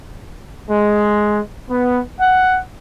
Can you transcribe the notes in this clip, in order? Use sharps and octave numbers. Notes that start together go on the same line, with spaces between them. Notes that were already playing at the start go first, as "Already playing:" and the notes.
G#3
B3
F#5